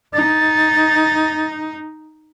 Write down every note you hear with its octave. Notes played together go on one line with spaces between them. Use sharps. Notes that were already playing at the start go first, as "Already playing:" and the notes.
D#4 A6